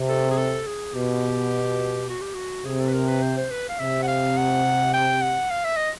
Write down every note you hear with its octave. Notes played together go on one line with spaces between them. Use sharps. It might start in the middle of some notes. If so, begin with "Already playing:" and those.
Already playing: C3
A4
G#4
A4
G#4
B2 G4
F#4
G4
F#4
C3 G#4
A4
B4
A#4
B4
C5
C5
B4
F5
C3 E5
F#5
F5
F#5
G5
F#5
F5
E5
D#5